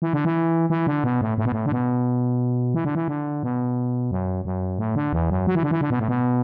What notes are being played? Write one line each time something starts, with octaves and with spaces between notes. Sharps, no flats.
E3
D3
E3
E3
D3
B2
A2
A2
B2
A2
D3
B2
E3
D3
E3
D3
B2
F#2
F#2
A2
D3
E2
F#2
F#3
E3
D3
E3
D3
B2
A2
B2